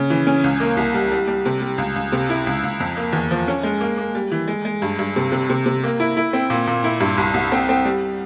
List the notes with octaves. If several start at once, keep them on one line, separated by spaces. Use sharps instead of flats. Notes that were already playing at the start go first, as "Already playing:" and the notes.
Already playing: C#3
E3
C#4
C#2
A#3
C2
G3
G3
G3
C3
G3
C#2
C#2
C3
E4
C#2
C#2
F2
A#3
E2
F3
C#4
G#3
A#3
A#3
G3
E3
G#3
G#3
G2
G2
C3
C3
C3
C3
A#3
E4
E4
C4
A#2
A#2
E4
G2
C2
C2
C4
C4
G3